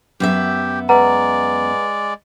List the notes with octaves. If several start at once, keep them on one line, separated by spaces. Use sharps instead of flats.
F#2 B3 G4 E5
G#3 B4 D5 F#5 A#5